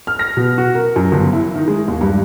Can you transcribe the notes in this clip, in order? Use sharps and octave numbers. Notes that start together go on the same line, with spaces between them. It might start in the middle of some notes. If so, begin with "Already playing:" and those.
F6
A#6
B2
F#4
A#4
F#2
G1
E4
D#3
G#3
D#2
G2